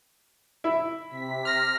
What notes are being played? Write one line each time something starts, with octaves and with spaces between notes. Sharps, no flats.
E4
C3 B6
F6 A#6